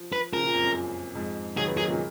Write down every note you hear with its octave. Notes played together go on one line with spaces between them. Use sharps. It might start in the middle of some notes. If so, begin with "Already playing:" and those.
Already playing: F3
B4
C#3 F3 A#4
A#2 C#3
F2
F#2
F#2
F2 G#2
D#3 F#3 G#4
G#3 B3
F#3 A#3 G#4
A#2 C#3